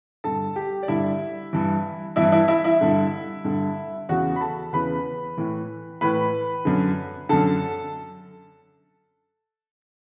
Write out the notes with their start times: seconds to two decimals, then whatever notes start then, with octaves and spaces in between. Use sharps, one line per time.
0.24 G2 D3 A4 A5
0.56 G4 G5
0.83 D5
0.88 G2 D3 E4 E5
1.53 G2 E3
2.16 G2 E3 E4 E5
2.32 E4 E5
2.48 E4 E5
2.64 E4 E5
2.81 G2 D3
3.45 G2 D3
4.09 E2 C#3 E3 F#4 F#5
4.36 B5
4.40 A4 A5
4.73 E2 C#3 E3 B4 B5
5.37 A2 E3
6.01 A2 E3 B4 B5
6.65 F#2 D3
7.29 F#2 D3 A4 A5